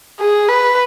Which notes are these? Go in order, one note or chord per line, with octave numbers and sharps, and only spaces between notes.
G#4
B4